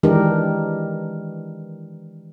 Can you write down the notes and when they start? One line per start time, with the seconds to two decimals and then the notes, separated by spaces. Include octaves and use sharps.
0.03 D#3 E3 G#3 D4 G4 A#4